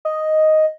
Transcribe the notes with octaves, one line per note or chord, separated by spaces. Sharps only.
D#5